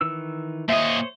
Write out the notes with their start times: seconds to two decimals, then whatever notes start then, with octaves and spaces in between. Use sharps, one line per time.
0.01 D#3 E3 E6
0.69 A#2 C5 C#5 D#5 E5